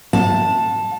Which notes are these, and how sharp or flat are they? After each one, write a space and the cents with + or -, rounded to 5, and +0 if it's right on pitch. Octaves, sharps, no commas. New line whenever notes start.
F#5 -45 A5 +0